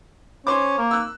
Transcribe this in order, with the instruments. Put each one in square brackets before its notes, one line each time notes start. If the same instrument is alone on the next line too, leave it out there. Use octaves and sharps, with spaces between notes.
[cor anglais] C#4 [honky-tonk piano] C5 D6
[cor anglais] A#3
[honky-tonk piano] E6 F#6